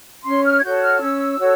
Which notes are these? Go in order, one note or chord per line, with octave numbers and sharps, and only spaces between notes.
C#4 C6
F6
G#6
F#4 A4 C#5 G6
F6
C#4 E6
F#4 A4 C#5